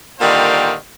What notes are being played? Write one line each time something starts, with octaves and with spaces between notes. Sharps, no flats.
A#2 D3 D#3 G3 C5 F5